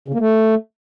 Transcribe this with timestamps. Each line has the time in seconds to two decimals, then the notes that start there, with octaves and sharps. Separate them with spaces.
0.08 C#3
0.14 A#3
0.20 A3